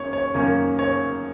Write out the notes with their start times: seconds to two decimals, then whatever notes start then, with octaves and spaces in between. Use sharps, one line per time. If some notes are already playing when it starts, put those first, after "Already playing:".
Already playing: F#2 D#3 A#3 C#4 C#5
0.13 C#5
0.35 F#2 D#3 A#3 C#4 C#5
0.79 C#5